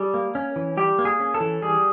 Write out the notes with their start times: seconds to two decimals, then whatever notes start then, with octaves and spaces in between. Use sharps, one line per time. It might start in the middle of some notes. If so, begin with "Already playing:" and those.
Already playing: G3 G#4
0.14 A#3
0.35 C#4
0.56 E3
0.77 G3 G4
0.99 A#3
1.05 G#4
1.20 C#4
1.34 A4
1.40 E3
1.62 G3 G#4